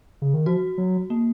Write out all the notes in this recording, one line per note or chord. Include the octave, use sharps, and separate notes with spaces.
C#3
D#3
F3 F#4
F#3
A#3